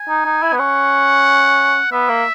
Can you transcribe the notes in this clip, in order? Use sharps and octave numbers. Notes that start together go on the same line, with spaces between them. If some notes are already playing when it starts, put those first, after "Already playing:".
Already playing: G#5
D#4
D#4
E4
B3
C#4 F#5
B3 E5
A#3